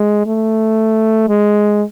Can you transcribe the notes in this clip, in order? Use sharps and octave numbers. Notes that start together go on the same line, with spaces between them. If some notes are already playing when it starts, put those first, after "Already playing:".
Already playing: G#3
A3
G#3